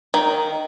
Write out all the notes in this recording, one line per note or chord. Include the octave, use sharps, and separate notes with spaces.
D#3